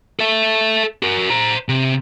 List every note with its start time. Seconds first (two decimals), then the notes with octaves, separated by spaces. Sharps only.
0.19 A4 E5
1.03 F#4 A#4
1.30 C5 A#5
1.69 C3